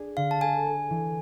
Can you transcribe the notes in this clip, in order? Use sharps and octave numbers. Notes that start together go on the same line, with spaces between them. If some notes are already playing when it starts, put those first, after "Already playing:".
Already playing: D4 G#4
D3 F5
A5
A4 G#5
A4
E3